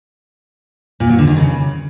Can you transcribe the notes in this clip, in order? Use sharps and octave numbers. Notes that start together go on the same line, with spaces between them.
A#2
F#3
D3
D#3
C#3